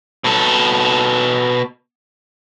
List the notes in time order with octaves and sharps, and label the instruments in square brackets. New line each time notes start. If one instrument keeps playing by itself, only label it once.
[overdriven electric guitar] B2 A4